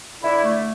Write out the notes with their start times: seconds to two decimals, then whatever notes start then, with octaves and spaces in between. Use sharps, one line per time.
0.22 D3 E4
0.43 A3